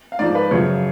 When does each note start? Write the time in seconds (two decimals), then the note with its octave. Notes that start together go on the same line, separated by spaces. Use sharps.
0.12 F5
0.19 G#2 F3 D5
0.35 B4
0.51 F#2 C#3 F3 C#5